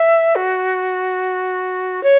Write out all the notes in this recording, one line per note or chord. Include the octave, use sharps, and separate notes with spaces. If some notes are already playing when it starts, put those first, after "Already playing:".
Already playing: E5
F#4
C#5